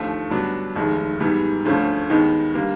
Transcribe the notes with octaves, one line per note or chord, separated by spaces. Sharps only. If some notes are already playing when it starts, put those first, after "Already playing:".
Already playing: D#2 D3 F3 A3
G2 D3 F#3 B3 D4
F1 D#2 D#3 G#3
G#2 E3 G3 B3
D2 D3 F3 A3 C#4
D#2 D#3 G#3 B3 D#4
D3 G3 A#3